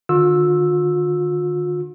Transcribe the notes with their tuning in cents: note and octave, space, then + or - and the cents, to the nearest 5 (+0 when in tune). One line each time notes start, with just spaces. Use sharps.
D3 +45 F4 +45 E6 +0